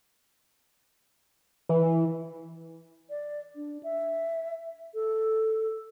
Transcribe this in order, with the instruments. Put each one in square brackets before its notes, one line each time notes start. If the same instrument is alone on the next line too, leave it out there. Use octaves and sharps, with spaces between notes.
[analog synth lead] E3
[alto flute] D5
D4
E5
A4